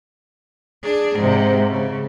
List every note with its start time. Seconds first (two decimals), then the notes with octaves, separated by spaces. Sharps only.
0.83 D4 G#4
1.16 G#2 C3
1.71 C#3